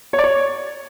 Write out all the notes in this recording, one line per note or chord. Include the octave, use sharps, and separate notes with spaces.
C#5
D5
C#5